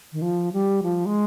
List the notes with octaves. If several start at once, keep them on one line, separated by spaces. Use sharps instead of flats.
D#3
F3
G3
F3
G#3